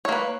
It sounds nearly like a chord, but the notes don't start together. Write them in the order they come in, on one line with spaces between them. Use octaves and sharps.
C#5 A#3 B4